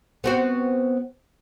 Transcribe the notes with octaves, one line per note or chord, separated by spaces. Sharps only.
B3 C4 F#4